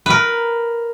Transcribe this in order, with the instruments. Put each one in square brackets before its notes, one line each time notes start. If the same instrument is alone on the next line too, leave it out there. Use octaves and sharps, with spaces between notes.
[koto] A#4 B4